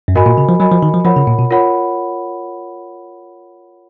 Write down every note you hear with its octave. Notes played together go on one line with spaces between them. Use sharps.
F#2
G#2 F#4 A#4 D#5 G#5 B5
A#2
C#3
F3
F#3 F#4 A#4 D#5 G#5 B5
F3
D#3
F3
F3 F4 A#4 C#5 F#5 B5
C#3
A#2
B2
F4 A#4 C#5 F#5 B5